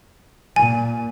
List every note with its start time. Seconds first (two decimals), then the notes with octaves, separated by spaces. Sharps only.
0.56 A#2 G#5